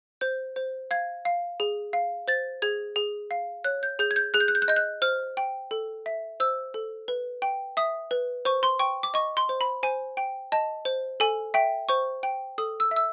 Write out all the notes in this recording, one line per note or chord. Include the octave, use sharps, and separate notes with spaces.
C5 G6
C5
F5 G#6
F5
G#4
F5
C5 A6
G#4 G#6
G#4
F5
C#5 F#6
G6
G#4 G6
G#6
G6
G#4 F#6
G6
F#6
G6
F#6
D#5 G6
F#6
C5 F6
G5
A4
E5
C5 E6
A4
B4
G5
E5 D#6
B4
C5 C#6
C6
G5 C#6
D6
D#5 C#6
C6
C5
B5
C5 G#5
G5
D#5 A5
C5
A4 G#5
E5 G5
C5 C#6
G5
A4 D#6
E6
E5
E6